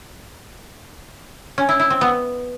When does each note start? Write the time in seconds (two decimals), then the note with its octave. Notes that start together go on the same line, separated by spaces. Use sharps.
1.58 C#4
1.69 E4
1.80 E4
1.90 C4
2.01 B3